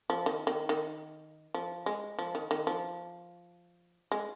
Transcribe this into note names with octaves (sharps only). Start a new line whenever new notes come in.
F3
D#3
D#3
D#3
F3
G#3
F3
D#3
D#3
F3
G#3